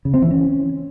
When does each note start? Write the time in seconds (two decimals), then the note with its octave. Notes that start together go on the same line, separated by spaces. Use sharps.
0.05 C#3
0.14 C4
0.22 E3
0.31 C#4